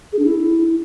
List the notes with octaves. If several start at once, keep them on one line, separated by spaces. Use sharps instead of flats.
G#4
D4
E4